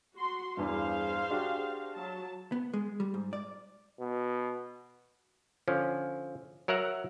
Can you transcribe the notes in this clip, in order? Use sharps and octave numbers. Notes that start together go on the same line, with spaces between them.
F#4 C6
E2 G2 G#4 C5 F5
D4 F#4 G4
F#3 A5
B3
G#3
G3
G#2
D5
B2
D3 F3 C#4
F#3 A#4 E5 F#5 A#5